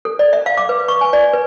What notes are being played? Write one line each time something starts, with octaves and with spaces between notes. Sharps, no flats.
A4
D5
E5
F5
D6
B4
C#6
G#5
D5
B4